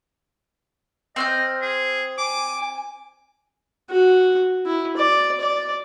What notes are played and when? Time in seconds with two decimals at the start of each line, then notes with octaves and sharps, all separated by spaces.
1.16 C4 D#5 F6 G6
1.61 G#4
2.18 G#5 D6
3.90 F#4
4.66 E4
4.97 D5
5.41 D5